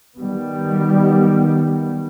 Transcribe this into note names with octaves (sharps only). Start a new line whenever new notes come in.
D#3 G3 B3